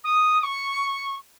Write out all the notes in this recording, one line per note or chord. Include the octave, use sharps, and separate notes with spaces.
D#6
D#6
C#6